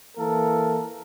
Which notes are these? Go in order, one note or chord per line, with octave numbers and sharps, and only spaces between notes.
E3 A#3 A4 A#4